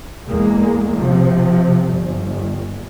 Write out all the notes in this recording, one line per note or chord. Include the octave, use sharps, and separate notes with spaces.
E2 G#3 A#3
C3 F3
G1